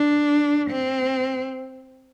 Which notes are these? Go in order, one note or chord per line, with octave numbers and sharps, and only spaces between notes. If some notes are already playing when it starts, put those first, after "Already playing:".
Already playing: D4
C4